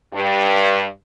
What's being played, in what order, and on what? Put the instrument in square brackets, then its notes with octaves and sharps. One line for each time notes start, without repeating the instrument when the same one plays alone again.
[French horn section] G2